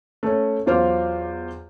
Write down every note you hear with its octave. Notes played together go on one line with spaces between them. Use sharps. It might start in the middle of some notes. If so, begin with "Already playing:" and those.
A3 C#4
E2 F#3 F4 C5 D6 F6